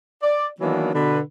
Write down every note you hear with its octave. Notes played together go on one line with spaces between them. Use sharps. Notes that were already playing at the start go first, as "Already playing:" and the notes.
D5
D#3 E3 F#3 A#3 B3 D4
B2 D3 B4